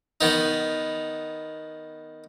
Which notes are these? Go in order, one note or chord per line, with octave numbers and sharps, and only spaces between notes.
D#3 B3 D#4